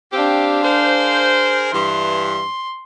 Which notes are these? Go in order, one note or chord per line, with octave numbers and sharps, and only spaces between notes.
C4 D4 G4 F5
G#4 A#4 C5
G2 E3 C6